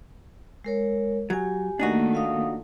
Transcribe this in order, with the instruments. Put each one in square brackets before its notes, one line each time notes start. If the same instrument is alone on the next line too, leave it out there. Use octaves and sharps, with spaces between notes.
[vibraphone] G#3 A#4 C#5
[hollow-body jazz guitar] F#3 [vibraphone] G4 G#5
[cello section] D#3 A3 A#3 [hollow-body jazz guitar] D4 D#4 F#4
[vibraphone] F4 F5 D#6